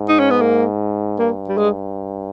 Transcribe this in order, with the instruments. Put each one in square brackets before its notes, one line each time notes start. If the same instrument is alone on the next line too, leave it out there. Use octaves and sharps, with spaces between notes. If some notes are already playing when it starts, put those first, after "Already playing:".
Already playing: [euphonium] G#2
[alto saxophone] D#4
C#4
B3
A#3
[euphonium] G2 [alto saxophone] A#3
[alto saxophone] G3
G#3